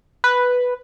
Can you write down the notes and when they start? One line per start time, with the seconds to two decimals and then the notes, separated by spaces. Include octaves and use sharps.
0.24 B4